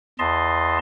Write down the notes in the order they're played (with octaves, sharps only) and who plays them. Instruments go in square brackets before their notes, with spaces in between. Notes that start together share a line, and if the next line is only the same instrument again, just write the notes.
[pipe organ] E2 D#5 A5 C6